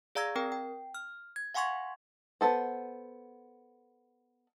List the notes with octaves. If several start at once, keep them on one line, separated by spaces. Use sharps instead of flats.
G#4 D5 F5 A#5 E6 G#6
C4 A#4 G5
G5
F6
G#6
F5 F#5 G#5 C6 C#6 G#6
B3 A4 C5